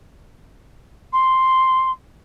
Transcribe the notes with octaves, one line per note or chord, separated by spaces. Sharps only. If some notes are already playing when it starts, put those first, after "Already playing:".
C6